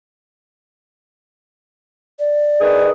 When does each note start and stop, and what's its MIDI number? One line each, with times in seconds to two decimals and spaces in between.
2.19 2.90 74
2.61 2.91 51
2.61 2.91 68
2.61 2.91 71